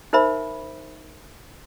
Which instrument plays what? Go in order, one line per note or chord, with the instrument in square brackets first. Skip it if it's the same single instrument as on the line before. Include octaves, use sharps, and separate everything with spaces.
[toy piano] D#4 A#4 C5 E5 B5